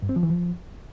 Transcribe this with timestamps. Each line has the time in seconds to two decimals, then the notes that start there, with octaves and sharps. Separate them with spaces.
0.02 G2
0.09 C4
0.16 F3
0.23 E3
0.30 F3